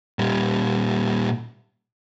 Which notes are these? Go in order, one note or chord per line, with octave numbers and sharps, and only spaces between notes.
A#2 G3